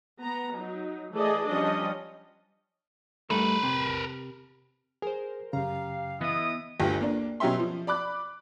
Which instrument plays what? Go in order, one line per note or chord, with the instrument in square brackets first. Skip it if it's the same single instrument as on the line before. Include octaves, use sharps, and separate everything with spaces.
[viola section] B3 A#5
F#3 D#4
E3 A3 G#4 A4 D5 D#5
F3 G3 C#4 D4 D#5
[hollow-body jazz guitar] G2 A3 [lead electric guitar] A#4 B4
[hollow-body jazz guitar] C3
[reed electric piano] G#4 [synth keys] A#4 C5
[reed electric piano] F#2 C#3 [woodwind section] G4 F5 [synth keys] A#5
[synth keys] E3 B3 [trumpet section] E4 D#5 D#6
[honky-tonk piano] G1 D2 F4 G4
A#3 D4
B2 F#3 C#4 G4 E5 C6
F3
D5 B5 D6 F#6